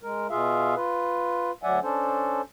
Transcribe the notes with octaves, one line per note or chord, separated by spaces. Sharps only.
G#3 A#4
B2 F4 G#4 E5 F5
F4 B4
D2 F#3 D5 E5 F#5 G#5
C#4 D4 A4 C5